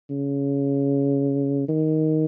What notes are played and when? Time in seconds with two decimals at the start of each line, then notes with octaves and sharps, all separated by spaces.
0.10 C#3
1.68 D#3